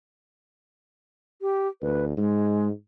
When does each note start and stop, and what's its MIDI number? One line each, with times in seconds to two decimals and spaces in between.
1.42 1.68 67
1.82 2.16 38
1.82 2.04 71
2.17 2.71 44
2.17 2.68 56